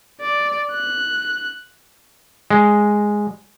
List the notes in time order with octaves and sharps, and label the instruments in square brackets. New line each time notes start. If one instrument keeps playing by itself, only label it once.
[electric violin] D5
F#6
[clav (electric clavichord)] G#3